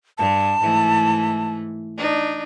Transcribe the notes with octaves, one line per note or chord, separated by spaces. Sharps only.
G2 A5
G#2 E3 A3
D4 D#4